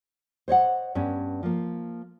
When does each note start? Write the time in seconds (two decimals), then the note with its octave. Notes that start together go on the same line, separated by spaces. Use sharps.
0.48 C5 C#5 D#5 F#5
0.95 G2 B3 C#4
1.43 F3 A#3